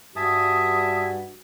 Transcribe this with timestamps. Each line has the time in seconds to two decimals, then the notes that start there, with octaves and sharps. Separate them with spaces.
0.16 G2 F#4 E5 G#5 A5 D#6